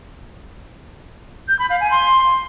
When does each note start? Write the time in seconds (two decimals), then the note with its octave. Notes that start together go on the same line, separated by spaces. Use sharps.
1.48 G6
1.59 B5
1.70 F5
1.80 G#5
1.91 C6